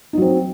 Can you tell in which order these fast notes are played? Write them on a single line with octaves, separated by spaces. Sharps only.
D#4 F#3 C4